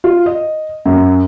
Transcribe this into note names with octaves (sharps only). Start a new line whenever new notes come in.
F4
D#5
F#2